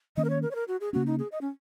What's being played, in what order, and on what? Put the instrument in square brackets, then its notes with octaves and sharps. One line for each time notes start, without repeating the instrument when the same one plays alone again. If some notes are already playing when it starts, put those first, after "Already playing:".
[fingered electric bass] D#3 A#3 C#4 [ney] D#5
[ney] A#4
C#5
A#4
C#5
A#4
F#4
G#4
[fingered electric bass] C#3 A#3 C#4 [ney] F#4
[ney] D#4
G#4
D#5
C#4